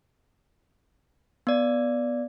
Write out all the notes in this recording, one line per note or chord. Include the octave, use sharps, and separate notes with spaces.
B3 D5